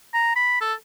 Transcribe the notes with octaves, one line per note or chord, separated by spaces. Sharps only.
A#5
B5
A4